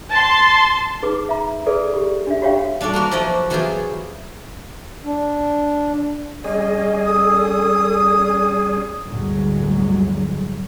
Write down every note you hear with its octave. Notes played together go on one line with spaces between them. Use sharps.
A5 C6
D#4 G#4 B4 D6
E5 A#5
G#4 A4 B4 D5
G4
D4 E5
F#4 G4 C#5 E5 F5 G5
G3 D4 F#4 A4 D5
A#3 F#4 A#4 B4
F3 F#3 E4 F#4 D5 D#5
E3 F#3 B3 F4 G4 G#4
D4
G3 C#4 G#4 D#5
A4 D#6
G1 D2 A2 D3 F#3 G#3